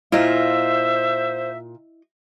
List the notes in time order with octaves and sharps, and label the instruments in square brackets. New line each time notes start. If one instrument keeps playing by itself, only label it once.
[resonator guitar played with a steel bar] A#2 F4 [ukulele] E4 D#5 [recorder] C5 [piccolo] E5